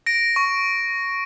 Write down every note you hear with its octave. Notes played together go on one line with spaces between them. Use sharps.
A#6 D7
C#6